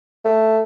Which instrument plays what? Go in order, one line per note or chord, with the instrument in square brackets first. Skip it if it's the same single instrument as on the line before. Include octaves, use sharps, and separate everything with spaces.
[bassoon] A3